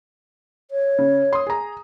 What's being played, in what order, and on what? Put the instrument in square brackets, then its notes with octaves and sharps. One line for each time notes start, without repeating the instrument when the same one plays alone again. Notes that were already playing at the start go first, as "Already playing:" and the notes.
[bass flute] C#5
[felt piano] C#3
C6 D#6
G#4 A#5